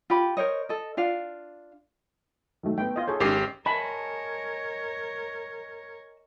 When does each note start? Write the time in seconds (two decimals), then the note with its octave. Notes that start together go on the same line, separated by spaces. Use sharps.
0.10 F4 G4 B5
0.37 A#4 C5 C#5 D#5
0.69 A4 D#5
0.97 D4 F4 F5
2.63 D#3 F#3 A3
2.78 A3 B3 G5
2.96 F4 D#5
3.08 G#4 A4 C#5 G6
3.20 G#1 G#3 C#4 G4 A#4 D#5 G#5 C7
3.66 A#4 C#5 D#5 G#5 A5 B5